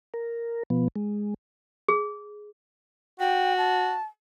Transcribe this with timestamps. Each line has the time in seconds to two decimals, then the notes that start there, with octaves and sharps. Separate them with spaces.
0.14 A#4
0.70 B2 F3 B3
0.96 G#3
1.88 G#4
3.20 F#4 G5
3.58 A5